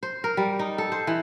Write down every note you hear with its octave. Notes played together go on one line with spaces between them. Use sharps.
C5
A#4
G3
D#4
A4
C5
E3